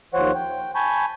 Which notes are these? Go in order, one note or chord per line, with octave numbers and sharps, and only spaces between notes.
D#2 F3 C5 C#5 F#5
G5
G#5 A5 B5 C#6 G6